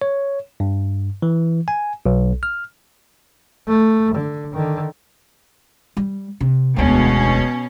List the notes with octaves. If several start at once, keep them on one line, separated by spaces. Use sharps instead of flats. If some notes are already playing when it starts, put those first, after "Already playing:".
C#5
G2
E3
G#5
B1
F6
A3
D3
D3 D#3
G3
C3
E1 D2 B2 C#4